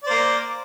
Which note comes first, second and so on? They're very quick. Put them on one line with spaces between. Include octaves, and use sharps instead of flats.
D5 C5 A#3